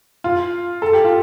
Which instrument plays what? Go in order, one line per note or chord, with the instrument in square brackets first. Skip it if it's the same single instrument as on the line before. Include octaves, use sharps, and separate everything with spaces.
[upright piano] F4
A4
G4
F4